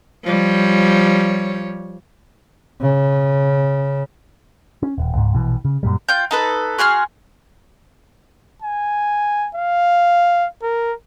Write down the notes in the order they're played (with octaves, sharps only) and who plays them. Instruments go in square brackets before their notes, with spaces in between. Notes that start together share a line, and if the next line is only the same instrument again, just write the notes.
[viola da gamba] F3 G3 C#5
[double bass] C#3
[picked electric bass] C#4
D#1
C#2 G#2
A#1 B2 E3
C#3
F#2 A#2 G3
[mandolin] F4 G5 G6
D#4 A4 B4
F#4 G#4 C6 F6
[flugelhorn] G#5
F5
A#4